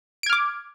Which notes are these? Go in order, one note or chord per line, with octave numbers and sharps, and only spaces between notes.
D6 F6 G#6 D7